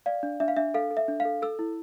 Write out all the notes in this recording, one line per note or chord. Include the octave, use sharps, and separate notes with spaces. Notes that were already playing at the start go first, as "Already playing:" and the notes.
D5 F5
D4
D4 E5
F5
D4 E5
A4 F5
A4
E5
D4
F5
A4
A4 E6
E4